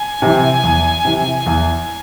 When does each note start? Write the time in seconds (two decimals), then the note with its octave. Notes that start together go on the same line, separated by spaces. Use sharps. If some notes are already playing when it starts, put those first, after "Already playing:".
Already playing: G#5
0.22 C3 E3
0.63 E2
1.05 C3 E3
1.46 E2